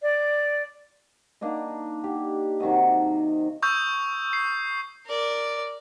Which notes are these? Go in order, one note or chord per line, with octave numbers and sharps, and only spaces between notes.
D5
A#3 D4 D#4 D#5
G4
C3 D#3 F#4 D#5
C#6 D#6 E6 G6
C7
A#4 D5